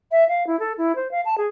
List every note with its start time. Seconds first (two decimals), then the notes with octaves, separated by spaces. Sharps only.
0.11 E5
0.29 F5
0.47 E4
0.60 A4
0.78 E4
0.96 C5
1.11 F5
1.25 A5
1.38 G#4